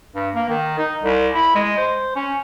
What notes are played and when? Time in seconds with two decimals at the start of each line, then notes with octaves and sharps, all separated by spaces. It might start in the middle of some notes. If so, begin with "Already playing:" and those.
0.15 G2
0.35 A#3
0.50 D#3
0.78 D#4
1.03 C2
1.34 E4
1.55 G#3
1.78 C5
2.15 C#4